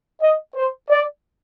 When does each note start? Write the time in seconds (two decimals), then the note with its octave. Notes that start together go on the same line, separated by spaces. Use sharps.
0.21 D#5
0.55 C5
0.90 D5